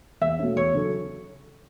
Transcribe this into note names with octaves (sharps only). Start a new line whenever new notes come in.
E2 E5
B2 A3 C#4
E2 C#5
C#3 F#3 C#4 A4